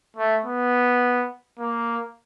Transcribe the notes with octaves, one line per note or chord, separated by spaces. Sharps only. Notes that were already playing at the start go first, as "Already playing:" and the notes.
A3
B3
A#3